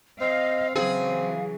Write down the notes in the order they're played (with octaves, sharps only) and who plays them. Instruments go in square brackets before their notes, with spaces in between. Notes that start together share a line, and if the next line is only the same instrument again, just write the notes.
[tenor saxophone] C4 [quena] D#5 [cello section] F5
[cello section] C#3 E3 F#3 [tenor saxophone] C4 [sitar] G#4 [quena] F5